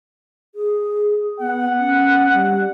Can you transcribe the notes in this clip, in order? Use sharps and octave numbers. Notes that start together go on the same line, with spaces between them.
G#4
B3 F#5
C#4
G3